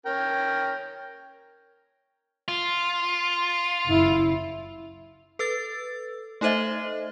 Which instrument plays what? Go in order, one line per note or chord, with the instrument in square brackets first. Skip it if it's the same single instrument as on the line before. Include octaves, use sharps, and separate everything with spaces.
[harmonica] C#4 A#4 G5
[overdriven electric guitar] F4
[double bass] F#1 E4
[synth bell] A4 B4 E6 A6
A3 D#4 A4 C5 D#5 E5